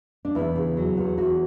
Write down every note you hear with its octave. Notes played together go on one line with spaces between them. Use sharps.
D4
E2 E4
C#3
F#3
E2
E2 F#4